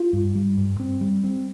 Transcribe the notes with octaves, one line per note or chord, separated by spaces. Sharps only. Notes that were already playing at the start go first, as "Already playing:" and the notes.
Already playing: F4
G2
G3
G2
C4
G3
C4